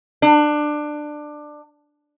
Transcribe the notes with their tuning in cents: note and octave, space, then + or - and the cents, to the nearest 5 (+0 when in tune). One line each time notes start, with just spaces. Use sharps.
D4 +20